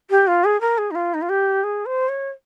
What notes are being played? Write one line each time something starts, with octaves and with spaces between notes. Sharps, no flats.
G4
F4
G#4
A#4
G#4
D#4
F4
D#4
F4
G4
G#4
C5
C#5